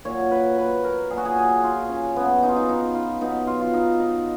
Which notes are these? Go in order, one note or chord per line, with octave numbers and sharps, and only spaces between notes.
A#2 F#3 C#5
B4
B4
A#4
A#2 F#3 G#4
F#4
G#4
G#4
F4
C#4
C#3 F#3 B3
D#4
F4
D#4
D#4
F4
B2 F#3 D#4
F4
F4
D#4
D#4